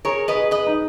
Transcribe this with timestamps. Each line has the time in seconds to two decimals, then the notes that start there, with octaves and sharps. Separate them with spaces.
0.05 G#4 A#4 C#5
0.28 B4 D#5
0.35 G#4
0.51 B4 D#5
0.67 D#4